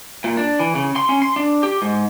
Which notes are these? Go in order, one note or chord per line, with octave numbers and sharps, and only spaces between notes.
A#2
D4
E3
C#3
C6
C#4
C6
D4
G4
G#2